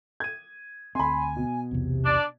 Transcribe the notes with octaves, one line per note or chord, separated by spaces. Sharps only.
G#6 D#7
D2 C4 G#5 B5 C6
B2
B1 E2 C3
D4 D5